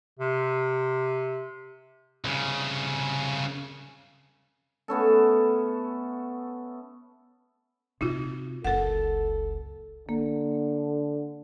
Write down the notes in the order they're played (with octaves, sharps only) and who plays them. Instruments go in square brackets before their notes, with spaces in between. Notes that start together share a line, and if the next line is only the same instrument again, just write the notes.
[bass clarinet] C3
[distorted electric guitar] C2 C#3
[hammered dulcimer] A3 B3 C#4 A4
[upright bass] C3 [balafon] D#4 F4 F#4
[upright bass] F#1 C#2 [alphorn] A4 [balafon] A#4 F#5
[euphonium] D3 [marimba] A#3